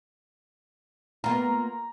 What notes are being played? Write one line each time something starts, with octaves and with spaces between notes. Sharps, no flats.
A#3 B3 F4 A#5